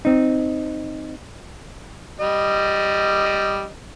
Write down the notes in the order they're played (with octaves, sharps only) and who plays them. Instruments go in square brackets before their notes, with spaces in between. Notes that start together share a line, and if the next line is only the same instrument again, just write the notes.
[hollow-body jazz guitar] C4 D#4
[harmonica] G3 D#5